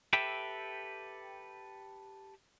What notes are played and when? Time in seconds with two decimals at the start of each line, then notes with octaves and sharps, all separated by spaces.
0.13 G4 A4 B4 E5 G5